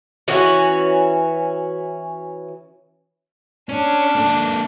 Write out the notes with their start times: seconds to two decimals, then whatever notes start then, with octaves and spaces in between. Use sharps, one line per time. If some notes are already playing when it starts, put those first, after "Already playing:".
0.28 E3 C#4 F#4
3.69 C#4 D4
4.16 A#3 A4